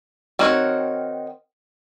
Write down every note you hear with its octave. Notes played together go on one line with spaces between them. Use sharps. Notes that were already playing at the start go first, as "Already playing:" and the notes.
D#3 C4 F#4 A#4 C#5